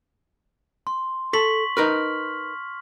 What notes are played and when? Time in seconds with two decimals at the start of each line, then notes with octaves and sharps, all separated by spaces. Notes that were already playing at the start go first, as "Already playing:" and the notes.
0.87 C6
1.33 A4 C#6 B6 F#7
1.77 D#4 A#4 B4 F6